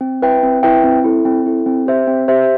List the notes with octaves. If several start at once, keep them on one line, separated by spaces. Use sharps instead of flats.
C4
E4 B4 E5 G5
C4
E4 B4 E5 G5
C4
E4 A4
C4
E4 A4
C4
G4 C5 E5
C4
G4 C5 E5